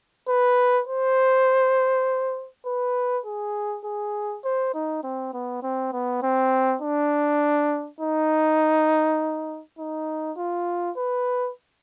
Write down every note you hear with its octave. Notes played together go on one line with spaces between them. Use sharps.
B4
C5
B4
G#4
G#4
C5
D#4
C4
B3
C4
B3
C4
D4
D#4
D#4
F4
B4